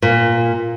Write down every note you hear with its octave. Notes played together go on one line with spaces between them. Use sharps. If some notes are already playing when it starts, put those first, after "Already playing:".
A#2